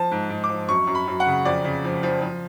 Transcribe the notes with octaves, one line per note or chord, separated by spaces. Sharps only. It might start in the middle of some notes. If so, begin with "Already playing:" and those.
Already playing: F3 A5
G#2
G#2
D6
F3
F#2 C#6
F#2
B5
F#2
F#5
C#3
F2 D5
C#3
F3
F3
F3